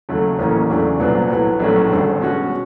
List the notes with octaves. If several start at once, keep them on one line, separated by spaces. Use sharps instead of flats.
D#2 C#3 F#3 A3
A1 A2 F#3 A#3 C#4
E2 C#3 F#3 A3 D4
C2 A#2 F#3 B3 D4
A2 F#3 B3
A#1 A2 F#3 A3 C#4
G#1 G2 D3
B2 G#3 C#4 F#4